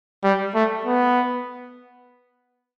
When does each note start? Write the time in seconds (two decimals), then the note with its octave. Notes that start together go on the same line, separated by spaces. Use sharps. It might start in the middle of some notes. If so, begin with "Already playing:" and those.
0.24 G3
0.55 A3
0.85 B3